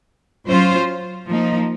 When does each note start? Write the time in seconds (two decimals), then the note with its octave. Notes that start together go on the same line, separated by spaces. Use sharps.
0.48 F#3 C#4 F4 C5
1.28 F3 A#3 D#4